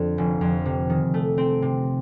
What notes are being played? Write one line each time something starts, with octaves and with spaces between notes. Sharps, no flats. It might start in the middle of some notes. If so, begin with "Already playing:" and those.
Already playing: F2 D3
F1
F2
C3
D#3
A3
C4
C3